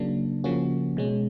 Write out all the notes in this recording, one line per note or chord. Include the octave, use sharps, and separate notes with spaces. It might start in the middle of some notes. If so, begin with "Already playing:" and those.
Already playing: C#3 F#3 A#3 D4
C#3 F3 A#3 C#4 F#4
B2 G#3 C#4